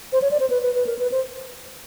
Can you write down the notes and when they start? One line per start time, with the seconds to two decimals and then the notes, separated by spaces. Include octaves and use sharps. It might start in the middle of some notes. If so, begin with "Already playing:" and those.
0.13 C5
0.22 C#5
0.31 D5
0.40 C5
0.50 B4
0.63 B4
0.75 B4
0.87 A#4
0.99 B4
1.12 C5